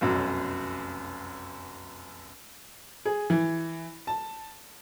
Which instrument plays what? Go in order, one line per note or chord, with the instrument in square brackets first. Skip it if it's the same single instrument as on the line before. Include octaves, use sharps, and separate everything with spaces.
[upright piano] F1 B1 F#2
G#4
E3
A5